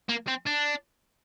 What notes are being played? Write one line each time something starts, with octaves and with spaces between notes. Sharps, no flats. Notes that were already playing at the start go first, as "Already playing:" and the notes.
A#3
C4
D4